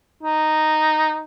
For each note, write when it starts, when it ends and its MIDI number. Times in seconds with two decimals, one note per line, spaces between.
0.23 1.23 63